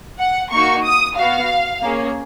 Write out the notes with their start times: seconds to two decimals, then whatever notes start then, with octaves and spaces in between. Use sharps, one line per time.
0.20 F#5
0.51 A#3 D#4 F#4 C#6
0.84 D#6
1.17 B3 F#4 F5
1.82 A#3 C#4 G#4